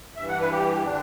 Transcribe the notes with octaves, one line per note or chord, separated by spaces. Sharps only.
G2 E3 E5
F#5
B4
G4
D3 D4